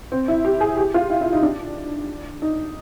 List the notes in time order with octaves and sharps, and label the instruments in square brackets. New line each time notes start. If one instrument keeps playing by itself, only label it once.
[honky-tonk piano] C4
E4
G4
G#4
G4
F4
E4
E4
D#4
D4
D#4